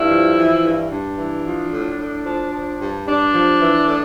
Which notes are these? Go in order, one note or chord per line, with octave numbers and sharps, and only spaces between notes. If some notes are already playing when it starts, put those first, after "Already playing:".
Already playing: G2 E4
F3
E3
G2
G2 D4
E3
F3
A2
A2
F3
F3
G2
G2 D4
F3
E3
A2